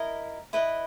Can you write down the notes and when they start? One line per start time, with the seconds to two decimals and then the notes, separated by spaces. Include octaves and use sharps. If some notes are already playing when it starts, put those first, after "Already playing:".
Already playing: E4 A#4 D#5
0.53 E4 B4 D#5